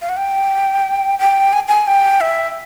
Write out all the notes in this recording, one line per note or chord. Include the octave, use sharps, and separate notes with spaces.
F5
F#5
G5
G5
G#5
G#5
G5
E5